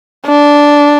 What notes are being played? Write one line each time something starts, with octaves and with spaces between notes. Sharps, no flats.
D4